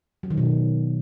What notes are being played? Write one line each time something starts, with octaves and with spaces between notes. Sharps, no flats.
F#3
D#3
B2